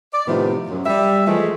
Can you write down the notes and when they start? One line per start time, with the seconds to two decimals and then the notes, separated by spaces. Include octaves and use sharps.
0.13 D5
0.28 A2 C3 D#3 F3 B3
0.70 F#2
0.86 G3 E5
1.27 E3 F3 G#3 A3